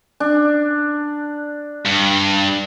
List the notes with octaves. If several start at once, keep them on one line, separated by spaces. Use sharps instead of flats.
D4
G2